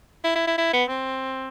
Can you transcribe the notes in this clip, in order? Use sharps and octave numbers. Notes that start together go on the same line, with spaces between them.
E4
E4
E4
E4
B3
C4